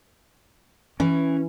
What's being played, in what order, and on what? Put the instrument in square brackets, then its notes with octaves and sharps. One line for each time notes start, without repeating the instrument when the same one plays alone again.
[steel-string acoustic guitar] E3 [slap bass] C#4